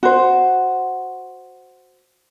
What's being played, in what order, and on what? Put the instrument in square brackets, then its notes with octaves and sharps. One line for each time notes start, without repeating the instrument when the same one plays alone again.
[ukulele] F#4 C5